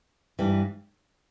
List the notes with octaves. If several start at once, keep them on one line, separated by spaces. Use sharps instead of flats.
G2 E3 G3